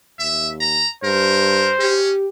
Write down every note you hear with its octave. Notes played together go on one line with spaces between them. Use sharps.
D#2 E5
A#5
G2 A#4 C5
C#4 G4